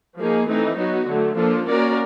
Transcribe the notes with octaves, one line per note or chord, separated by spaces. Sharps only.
F3 A#3 D#4 G#4
E3 A3 C4 D#4
F#3 B3 D#4 F#4
D3 F#3 A3
F3 A#3 D4 F4 A4
A#3 C#4 F#4 A#4 D5